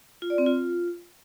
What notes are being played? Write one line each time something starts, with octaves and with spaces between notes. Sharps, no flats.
F4
D5
C4
F4